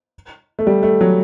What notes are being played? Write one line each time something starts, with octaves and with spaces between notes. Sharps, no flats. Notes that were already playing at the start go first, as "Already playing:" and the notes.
A3
G3
A3
F#3